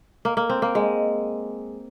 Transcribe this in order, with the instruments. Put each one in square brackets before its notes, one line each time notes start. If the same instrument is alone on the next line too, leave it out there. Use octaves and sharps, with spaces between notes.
[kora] A#3
A#3
C4
A#3
G#3